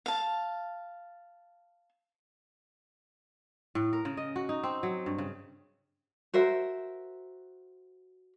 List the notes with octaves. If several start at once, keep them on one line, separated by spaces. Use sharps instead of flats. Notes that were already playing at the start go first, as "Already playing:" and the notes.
F5 A5
A2
A#4
C#3
D#5
F#4
D#4
C4
F#3
G2
C#3
F#4 A#4 C5 E5